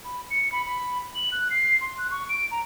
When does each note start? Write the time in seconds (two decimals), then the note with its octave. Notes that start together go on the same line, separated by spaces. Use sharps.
0.05 B5
0.30 C#7
0.52 B5
0.66 B5
1.15 F#7
1.32 F#6
1.50 C7
1.81 C6
1.98 F#6
2.11 C#6
2.29 D7
2.51 A#5